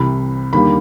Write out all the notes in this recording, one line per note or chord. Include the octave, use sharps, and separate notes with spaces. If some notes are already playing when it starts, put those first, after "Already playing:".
Already playing: C2 C3 E3 B5
D#2 D3 G3 A#3 B5